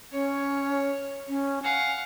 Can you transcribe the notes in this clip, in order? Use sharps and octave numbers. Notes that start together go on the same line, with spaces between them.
C#4 C#5
C#4
F5 F#5 G#5